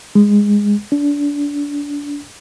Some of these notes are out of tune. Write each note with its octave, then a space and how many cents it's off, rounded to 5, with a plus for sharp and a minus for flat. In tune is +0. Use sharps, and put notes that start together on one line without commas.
G#3 -15
D4 -25